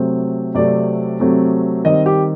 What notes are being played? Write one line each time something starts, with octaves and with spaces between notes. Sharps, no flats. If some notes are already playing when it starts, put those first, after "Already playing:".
Already playing: C3 F#3 A3 C4
C3 F#3 A3 C4 D5
C3 F#3 A3 C4
D#3 G3 C4 D#5
G4